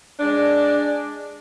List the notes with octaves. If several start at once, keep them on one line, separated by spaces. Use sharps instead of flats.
G#3 D4